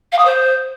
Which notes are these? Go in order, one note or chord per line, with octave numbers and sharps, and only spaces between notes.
F5
D#6
C5